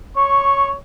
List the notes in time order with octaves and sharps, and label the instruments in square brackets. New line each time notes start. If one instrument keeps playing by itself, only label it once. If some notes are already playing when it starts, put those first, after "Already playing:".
[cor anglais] C#5 [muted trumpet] C#6